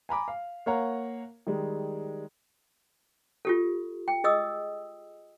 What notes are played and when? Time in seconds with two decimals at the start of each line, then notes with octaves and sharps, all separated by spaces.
0.09 G#5 A#5 B5 D6
0.28 F5
0.66 A#3 A#4 C#5 F5 F#5 A#5
1.47 D#3 G3 G#3
3.45 F4 G4 A4
4.08 G5
4.24 G#4 D#5 D#6 E6